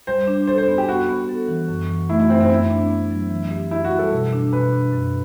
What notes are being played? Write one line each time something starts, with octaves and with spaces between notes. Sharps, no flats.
G3 C5
D4
A4 C5
C5
B3
G4
B3 F#4
B3
A4
E3
F#2
E3
A3 E4
E4
F#2 C4
C4
B3 E4
D4
B3
F#3
E3
G4
E4 G4
F#4
G3
A4
B2
D4
B2 B4
D4
F#2